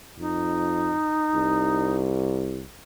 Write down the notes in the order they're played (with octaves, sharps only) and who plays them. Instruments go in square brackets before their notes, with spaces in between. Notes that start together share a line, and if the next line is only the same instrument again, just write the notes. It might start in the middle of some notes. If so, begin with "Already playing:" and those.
[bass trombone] F2 [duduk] D#4
[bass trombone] C2